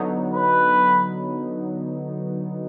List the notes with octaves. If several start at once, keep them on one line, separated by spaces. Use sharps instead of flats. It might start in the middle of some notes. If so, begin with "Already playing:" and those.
Already playing: D3 F#3 B3 D#4
B4